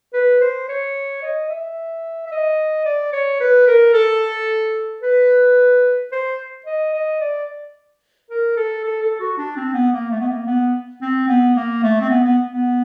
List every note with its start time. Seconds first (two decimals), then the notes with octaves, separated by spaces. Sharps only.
0.13 B4
0.41 C5
0.68 C#5
1.22 D#5
1.50 E5
2.26 E5
2.32 D#5
2.85 D5
3.13 C#5
3.40 B4
3.67 A#4
3.94 A4
5.02 B4
6.12 C5
6.66 D#5
6.94 D#5
7.20 D5
8.30 A#4
8.56 A4
8.84 A4
9.02 A4
9.20 F#4
9.38 D4
9.56 C4
9.74 B3
9.93 A#3
10.11 A3
10.20 B3
10.29 A#3
10.46 B3
11.02 C4
11.28 B3
11.56 A#3
11.83 A3
12.01 C4
12.10 B3
12.24 B3
12.51 B3